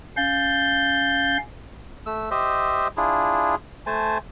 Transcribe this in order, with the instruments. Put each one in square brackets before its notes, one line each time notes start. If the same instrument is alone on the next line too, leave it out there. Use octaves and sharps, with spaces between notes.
[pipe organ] C#4 F5 A6 [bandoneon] G6
[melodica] A3 E6
G4 C5 D#5 E5
D4 E4 F4 G#4
A3 C5 G#5 A5